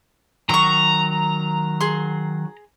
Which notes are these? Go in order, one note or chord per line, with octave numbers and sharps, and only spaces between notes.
D#3 F#3 A#5 C6 C#6
G#4 C6